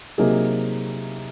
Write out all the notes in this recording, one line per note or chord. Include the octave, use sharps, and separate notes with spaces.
C3 F#3 A#3 D#4 G#4